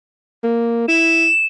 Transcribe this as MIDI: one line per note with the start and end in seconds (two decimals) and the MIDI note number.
0.44 0.88 58
0.88 1.28 64
0.88 1.46 100